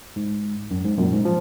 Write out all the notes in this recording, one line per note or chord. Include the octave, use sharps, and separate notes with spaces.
G#2
F#2
G#2
F#2 A#2
G#2
F3